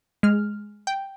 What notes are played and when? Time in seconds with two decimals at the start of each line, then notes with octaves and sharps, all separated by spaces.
0.23 G#3 F6
0.87 G5